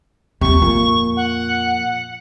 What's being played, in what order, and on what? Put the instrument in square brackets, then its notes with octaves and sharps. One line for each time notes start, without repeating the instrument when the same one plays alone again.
[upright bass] D#2 F3 [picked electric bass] C3 [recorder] C#6
[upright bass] F2 [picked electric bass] A#2
[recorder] F#5